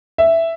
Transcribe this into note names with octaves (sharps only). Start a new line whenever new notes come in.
E5